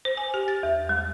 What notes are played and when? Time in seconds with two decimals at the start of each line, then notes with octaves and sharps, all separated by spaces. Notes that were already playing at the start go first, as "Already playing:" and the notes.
0.05 C5
0.17 G#5
0.34 G4
0.48 A6
0.63 E2
0.89 G3